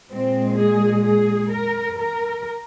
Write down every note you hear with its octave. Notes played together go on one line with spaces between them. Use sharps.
A#2 G#3 C4
G#4
G#4
A#4
A#4